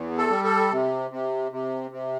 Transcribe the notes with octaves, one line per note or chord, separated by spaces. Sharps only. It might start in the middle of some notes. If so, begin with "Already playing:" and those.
Already playing: E2
A4
G3
A4
C3
C3
C3
C3